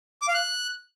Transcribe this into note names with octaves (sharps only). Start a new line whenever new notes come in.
D6
F5
F#6